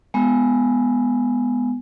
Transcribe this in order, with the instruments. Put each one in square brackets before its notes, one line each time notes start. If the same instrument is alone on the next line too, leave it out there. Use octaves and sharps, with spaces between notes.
[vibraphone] G#3 B3